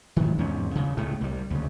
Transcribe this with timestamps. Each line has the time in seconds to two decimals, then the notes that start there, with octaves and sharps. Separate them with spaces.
0.16 G#2 D#3
0.38 E2 G#2 C3 C#4
0.75 D2 C#3
0.97 C#2 A2 G#3 A3
1.21 C2 G3
1.50 D2 C#3